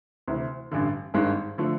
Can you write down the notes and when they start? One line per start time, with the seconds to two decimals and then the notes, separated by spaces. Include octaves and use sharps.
0.27 D2 C3 E3
0.71 A1 G2 D3
1.14 G#1 G2 D#3 G#3
1.58 D3 F3 A3